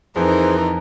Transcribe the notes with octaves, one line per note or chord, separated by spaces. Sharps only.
F2 E3 D#4 G#4 A#4 C5